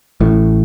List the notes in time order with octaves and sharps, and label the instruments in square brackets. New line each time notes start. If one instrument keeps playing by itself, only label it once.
[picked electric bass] A1 A2